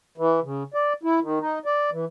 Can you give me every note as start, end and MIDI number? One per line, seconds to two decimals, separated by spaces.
0.18 0.40 52
0.44 0.63 49
0.74 0.93 74
1.03 1.20 64
1.22 1.39 51
1.40 1.59 63
1.66 1.90 74
1.92 2.05 52